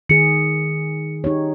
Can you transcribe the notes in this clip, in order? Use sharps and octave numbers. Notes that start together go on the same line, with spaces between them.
D#3 G#4 C#7
D#4 G4 C#5